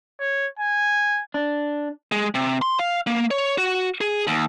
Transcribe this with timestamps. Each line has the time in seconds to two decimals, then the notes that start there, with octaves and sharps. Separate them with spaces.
0.20 C#5
0.59 G#5
1.34 D4
2.12 G#3
2.35 C3
2.62 C6
2.79 F5
3.07 A#3
3.31 C#5
3.58 F#4
4.01 G#4
4.27 D#2